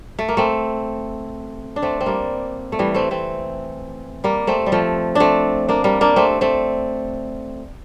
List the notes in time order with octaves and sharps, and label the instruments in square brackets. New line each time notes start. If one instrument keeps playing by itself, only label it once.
[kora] A3
A#3
A3 C4
D4
A3 C4
C4
G3 A#3
A3
E3 G3
A3 C4
A3 C4
G3 A#3
A3 C4
G3
F3 A3
A3 C4 D4
A#3 D4
G3 A#3
A#3 D4
A3 C4
A3 C4